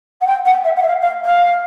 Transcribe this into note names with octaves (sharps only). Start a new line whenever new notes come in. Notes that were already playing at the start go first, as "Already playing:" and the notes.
F#5
G5
F#5
E5
F#5
E5
F5
F5
F5